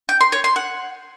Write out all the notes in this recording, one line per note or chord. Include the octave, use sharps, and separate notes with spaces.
G5
C6
C#5
C6
F#5